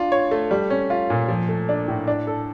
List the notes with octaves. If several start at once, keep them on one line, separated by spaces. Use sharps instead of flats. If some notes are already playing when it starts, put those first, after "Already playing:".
Already playing: D4 F4
C#5
A3
G3
C#4
F4
A#2
F3
A3
D4
A2
D4
A4